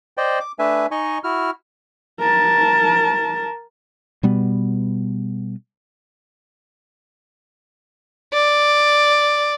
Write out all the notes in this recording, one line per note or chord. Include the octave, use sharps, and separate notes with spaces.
C5 D5 D#5 G5
D6
A3 D4 B4 E5 G#5
D#4 D#5 G#5 C#6
E4 F#4 F6
A#4 A5
B2 G3 B3
D5